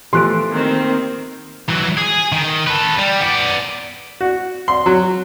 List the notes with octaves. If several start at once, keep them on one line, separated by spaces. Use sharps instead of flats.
E3 F3 A3 G4 C6 F#6 D7
D#3 A#3 C4
E3 F#3
G#4
D#3
A4 B4
G3
B3 D5
F#4
C6
F#3